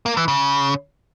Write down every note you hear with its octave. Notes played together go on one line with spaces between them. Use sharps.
A#3
E3
C#3